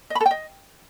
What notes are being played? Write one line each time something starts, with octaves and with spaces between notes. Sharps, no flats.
D#5
B5
A4
G5
D#5